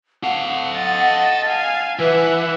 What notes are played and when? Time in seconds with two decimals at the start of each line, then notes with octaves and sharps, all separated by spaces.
0.24 A4 F5 F#5
0.74 D#5 A6
1.47 F5 G#5
1.99 E3 B4 E5 F#5